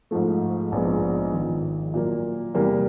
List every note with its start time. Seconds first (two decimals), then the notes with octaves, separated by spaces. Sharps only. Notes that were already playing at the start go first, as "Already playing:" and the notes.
0.11 G#2 F3 A3
0.72 A#1 G#2 F3 G#3 B3
1.33 G#1 G#2 F3
1.94 A#2 F#3 A#3
2.54 E2 C3 E3 G3 A#3